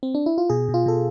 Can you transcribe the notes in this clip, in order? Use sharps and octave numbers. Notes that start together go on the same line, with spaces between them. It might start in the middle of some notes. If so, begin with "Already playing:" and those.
C4
D4
E4
F4
B2 G#4
B2
F4
B2 A4